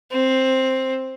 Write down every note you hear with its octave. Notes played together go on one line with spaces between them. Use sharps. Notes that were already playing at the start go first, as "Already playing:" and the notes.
C4